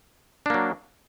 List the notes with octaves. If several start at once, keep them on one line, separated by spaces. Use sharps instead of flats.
F#3 A#3 D4